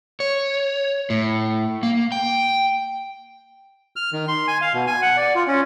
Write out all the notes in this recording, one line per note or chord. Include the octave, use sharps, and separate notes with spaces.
C#5
A2
A#3
G5
F6
D#3
C6
G#5
F5
B2
G#5
F#5
D5
F4
C#4